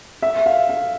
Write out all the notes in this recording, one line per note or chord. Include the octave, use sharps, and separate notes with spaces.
E5
F5
F5